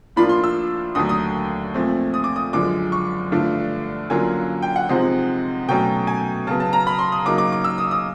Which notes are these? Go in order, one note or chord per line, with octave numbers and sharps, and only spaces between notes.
A2 F3 A#3 D4 F4 B5
C6
E6
D#2 D3 F#3 A3 D#6
D#6
A#2 F3 A3 C4
D#6
D6
D#6
F#2 D3 F3 G#3 D6
C#6
G2 D3 F3 A3 D4
D3 F#3 A#3 C#4 F4 G#5
G5
F#5
C3 F3 G#3 C4 D#4
B2 F#3 A3 C#4 G5
G#5
C#3 F#3 B3 A5
A5
A#5
B5
C6
D#6
C#3 F#3 A#3 D#4 D6
D6
D6
E6
D#6
D#6